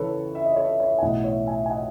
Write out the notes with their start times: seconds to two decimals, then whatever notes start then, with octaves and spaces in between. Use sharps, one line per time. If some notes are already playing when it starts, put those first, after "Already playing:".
Already playing: C#2 C#3 E3 A4 B4 C#5
0.35 E5
0.45 D#5
0.56 A4 C#5
0.80 C#5 E5
0.98 G#5
1.02 B1 A2 E3 D#5 F#5
1.24 C#5 E5
1.47 E5 G#5
1.66 G#5
1.70 D#5 F#5